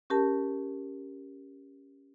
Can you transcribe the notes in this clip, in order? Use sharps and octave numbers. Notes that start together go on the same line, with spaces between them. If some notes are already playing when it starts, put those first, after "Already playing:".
C#4 G4 A#4 A5